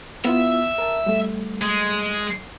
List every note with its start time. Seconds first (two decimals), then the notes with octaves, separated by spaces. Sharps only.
0.25 B3 E4 F4 E5
0.78 A#4 A5
1.06 G3 A3
1.62 G#3